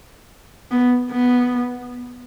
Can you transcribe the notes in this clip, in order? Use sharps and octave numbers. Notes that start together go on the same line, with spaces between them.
B3
B3